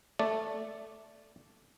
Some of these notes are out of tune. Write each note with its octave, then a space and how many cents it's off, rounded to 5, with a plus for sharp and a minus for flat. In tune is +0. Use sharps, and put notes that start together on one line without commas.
A3 +0 D5 -5